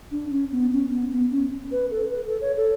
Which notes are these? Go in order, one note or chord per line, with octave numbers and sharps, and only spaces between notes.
D4
C#4
B3
C#4
B3
B3
C#4
B4
A4
B4
A4
C#5
A4